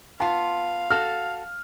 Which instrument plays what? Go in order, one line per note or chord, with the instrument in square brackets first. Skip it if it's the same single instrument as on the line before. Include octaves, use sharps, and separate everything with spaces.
[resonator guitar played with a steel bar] B3 F4 [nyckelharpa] F5 [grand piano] A5 C6
[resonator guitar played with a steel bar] F#4 A4 [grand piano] F6